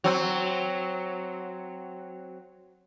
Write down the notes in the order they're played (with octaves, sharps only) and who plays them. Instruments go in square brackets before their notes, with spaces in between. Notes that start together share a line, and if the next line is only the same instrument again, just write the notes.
[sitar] F#3 C4